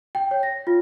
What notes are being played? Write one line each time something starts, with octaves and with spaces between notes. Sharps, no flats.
G5
C#5
A#6
F4